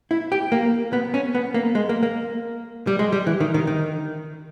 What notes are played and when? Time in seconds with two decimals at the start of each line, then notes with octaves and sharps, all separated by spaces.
0.11 E4
0.32 G4
0.52 A#3
0.93 B3
1.14 C#4
1.35 B3
1.54 A#3
1.75 G#3
1.89 A#3
2.03 A#3
2.87 G3
2.99 G#3
3.12 G3
3.27 E3
3.40 D#3
3.54 D#3
3.67 D#3